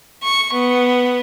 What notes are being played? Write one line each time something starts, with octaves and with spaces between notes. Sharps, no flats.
C#6
B3